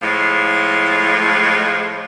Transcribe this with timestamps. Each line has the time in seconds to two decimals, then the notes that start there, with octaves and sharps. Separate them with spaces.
0.03 A2 F3 G#3